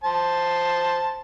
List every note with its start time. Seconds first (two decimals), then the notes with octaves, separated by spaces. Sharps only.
0.04 C5 A5